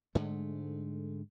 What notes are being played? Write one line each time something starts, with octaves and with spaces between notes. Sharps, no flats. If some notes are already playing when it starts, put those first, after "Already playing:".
G#2 D3 G#3 A3